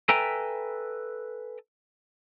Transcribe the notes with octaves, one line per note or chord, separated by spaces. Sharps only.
A4 B4 E5 G5 G#5 A#5